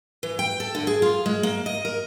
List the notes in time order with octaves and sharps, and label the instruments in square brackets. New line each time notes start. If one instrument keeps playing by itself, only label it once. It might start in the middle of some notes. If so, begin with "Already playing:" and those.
[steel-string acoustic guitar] E3
G5
A4
D3
G#4
F4
G#3
A#3
D#5
A#4